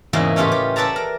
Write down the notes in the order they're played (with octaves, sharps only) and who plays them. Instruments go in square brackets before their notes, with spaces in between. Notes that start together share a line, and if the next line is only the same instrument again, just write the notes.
[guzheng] E2 G#2 C#3 A#3 E4 D#5
A2 A3 C#4 F4 G4 B4
G4
A4 B4 D5 E5 A5 A#5
A#4